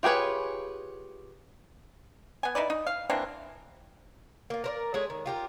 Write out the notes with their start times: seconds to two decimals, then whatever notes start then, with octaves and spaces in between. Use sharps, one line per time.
0.03 F4 G4 G#4 B4 C#5
2.43 B3 G#5
2.55 D#4 E4 B4 D5
2.70 D#4
2.87 F5
3.10 E3 A#3 C4 D4
4.50 A#3 F4
4.64 A#4 C5 D5
4.94 G#3 A3 G#4 C#5
5.10 D#3
5.26 F4 G4 A#4